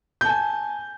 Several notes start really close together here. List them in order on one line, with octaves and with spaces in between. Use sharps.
G6 A5 G#5